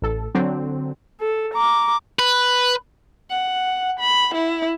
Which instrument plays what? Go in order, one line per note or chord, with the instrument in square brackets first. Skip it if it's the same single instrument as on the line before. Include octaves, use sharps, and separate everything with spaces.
[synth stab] A1 A4
D3 F#3 C4
[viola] A4
A#5 D6
[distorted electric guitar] B4
[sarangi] F#5
B5
E4